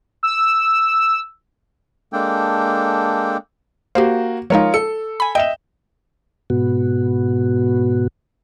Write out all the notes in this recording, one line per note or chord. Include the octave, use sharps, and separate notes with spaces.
E6
G#3 A#3 D4 A4 G5
A#3 F#4 G4 C5
F3 G#3 D#4 F4 A#4 C#5
A4 C#7
G#5 B5
D#5 E5 G5 E7
G#2 B2 B3 F#4